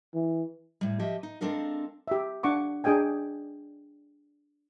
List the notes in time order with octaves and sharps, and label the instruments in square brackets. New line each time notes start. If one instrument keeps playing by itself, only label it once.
[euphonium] E3
[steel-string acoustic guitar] A2 G3
F3 G4 D#5 E5
D#4
G#3 C4 D4 A4 A#4 F5
[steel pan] G4 E5
D4 F#5 C#6 D6
D4 G#4 D#5 G5 G#5